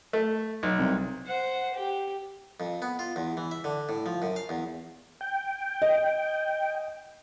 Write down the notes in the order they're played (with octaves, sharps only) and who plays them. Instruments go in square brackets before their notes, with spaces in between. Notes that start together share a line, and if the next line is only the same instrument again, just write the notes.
[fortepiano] A3
B1
[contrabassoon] C2
[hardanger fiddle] C5 F#5
G4
[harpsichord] F2
B3
F4
E2
E3
E5
D3
A2
F3
F#2
F5
E2
[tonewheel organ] G5
[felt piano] D#5